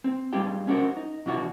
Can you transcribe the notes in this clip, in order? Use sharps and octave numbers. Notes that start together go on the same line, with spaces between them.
C4
G3 G#3 D4 F4 G4 G5
C#4 D4 F#4 G4 A#4 C5
D#4
B2 E3 D4 F4 F#4